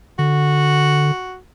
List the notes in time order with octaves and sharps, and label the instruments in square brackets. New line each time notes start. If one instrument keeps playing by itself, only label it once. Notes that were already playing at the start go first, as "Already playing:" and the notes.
[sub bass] D3 [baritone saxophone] F#4